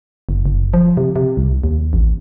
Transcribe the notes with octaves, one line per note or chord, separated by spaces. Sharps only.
F#1
F#1
F3
C3
C3
C2
D#2
A1